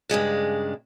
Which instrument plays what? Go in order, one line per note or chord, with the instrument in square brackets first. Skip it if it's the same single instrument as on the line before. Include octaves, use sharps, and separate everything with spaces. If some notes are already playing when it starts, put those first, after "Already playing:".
[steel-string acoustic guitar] G2 C#3 G#3 D4